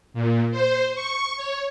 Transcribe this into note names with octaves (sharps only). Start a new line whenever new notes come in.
A#2
C5
C#6
C#5